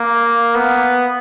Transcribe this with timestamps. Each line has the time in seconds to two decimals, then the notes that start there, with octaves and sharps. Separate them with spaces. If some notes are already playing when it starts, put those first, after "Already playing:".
Already playing: A#3
0.55 B3